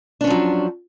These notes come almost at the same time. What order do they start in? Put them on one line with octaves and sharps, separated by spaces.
D4 C#4 F3 F#3